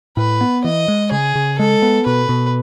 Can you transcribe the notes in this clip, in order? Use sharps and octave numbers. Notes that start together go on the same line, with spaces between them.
A2 B4
B3
E3 D#5
G#3
C#3 G#4
C#3
G#3 A4
B3
B2 B4
B2